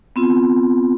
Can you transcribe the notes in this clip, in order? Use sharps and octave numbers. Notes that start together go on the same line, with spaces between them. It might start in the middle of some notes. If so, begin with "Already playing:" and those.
B3 C4 F4